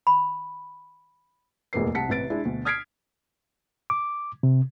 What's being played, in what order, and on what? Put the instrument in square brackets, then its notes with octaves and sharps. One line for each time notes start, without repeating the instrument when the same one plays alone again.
[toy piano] B5
[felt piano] F1 A#1 E2 A#3 B4 C7
C2 F#5 A5 B6 C#7
A1 C3 B4 A6 D7
G#3 D4 E4
D2 B2
D#6 F6 G#6 B6 C7 D7
[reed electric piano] D6
C3